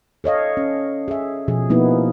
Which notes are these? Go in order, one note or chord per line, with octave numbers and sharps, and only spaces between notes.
A4 C#5 D#5 F5
C#4
G#4 E5
B2 F3 G#4
F3 A#3 B3 D#4 E4